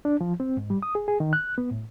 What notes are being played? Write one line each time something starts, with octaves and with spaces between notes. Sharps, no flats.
D4
F3
C4
G#2
G3
D#6
G#4
G#4
D#3
F#6
B3
A2